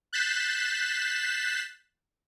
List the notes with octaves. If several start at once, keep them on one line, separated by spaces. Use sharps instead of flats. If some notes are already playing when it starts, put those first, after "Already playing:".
F#6 G6 A6 B6 C7 E7